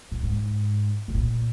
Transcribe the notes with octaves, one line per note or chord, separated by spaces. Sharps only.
A#2
G#2
B2
A#2